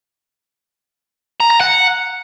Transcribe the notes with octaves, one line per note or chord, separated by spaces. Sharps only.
A#5
A#5
F#5